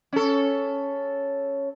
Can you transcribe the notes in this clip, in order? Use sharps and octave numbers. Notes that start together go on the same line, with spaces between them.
C#4 A4